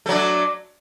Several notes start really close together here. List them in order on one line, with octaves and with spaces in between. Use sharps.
A3 F#3 D4